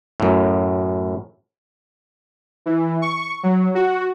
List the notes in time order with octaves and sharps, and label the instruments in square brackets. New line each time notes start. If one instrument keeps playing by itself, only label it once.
[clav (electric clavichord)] F#2 A2
[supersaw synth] E3
C#6
F#3
F#4